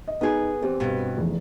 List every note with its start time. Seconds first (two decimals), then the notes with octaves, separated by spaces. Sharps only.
0.08 D#5
0.21 B3 D#4 G#4
0.62 E2 C4 G4
0.80 G2 B2
1.17 F1 E2